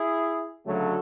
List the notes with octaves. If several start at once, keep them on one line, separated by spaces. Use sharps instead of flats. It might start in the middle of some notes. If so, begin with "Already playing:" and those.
Already playing: E4 G#4
D2 C#3 F#3 A3 F#4 A4